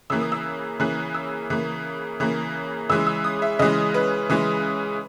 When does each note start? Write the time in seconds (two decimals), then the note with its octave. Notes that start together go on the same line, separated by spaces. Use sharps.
0.10 C#3 E3 A#3 E6
0.21 D#6
0.32 E6
0.80 C#3 E3 A#3 F#6
1.14 E6
1.50 C#3 E3 A#3
2.20 C#3 E3 A#3
2.90 C#3 E3 G#3 E6
3.07 E6
3.24 D#6
3.42 E5
3.59 C#3 E3 G#3 D#5
3.94 B4
4.30 C#3 E3 G#3